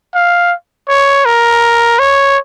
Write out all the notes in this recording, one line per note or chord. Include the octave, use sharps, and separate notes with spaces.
F5
C#5
A#4
C#5